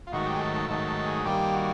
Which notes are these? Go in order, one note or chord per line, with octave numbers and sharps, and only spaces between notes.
F4
G#2 D#3 F#3 A3 F#4
G4
G#4
A4
A4
G#2 D#3 F#3 A3 A4
A4
G#4
G2 D#3 G3 A#3 G4
F#4